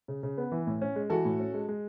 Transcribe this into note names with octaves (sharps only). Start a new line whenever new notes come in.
C#3
C#3
B3
E3
A2
C#4
G#3
E3 F#4 A4
A2
C#4
G#3
G#3